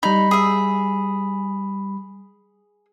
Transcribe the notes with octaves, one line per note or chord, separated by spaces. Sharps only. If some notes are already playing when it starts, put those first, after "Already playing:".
G3 D#4 B5
G#4 E5